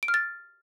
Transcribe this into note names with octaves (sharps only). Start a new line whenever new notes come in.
D7
F6
A6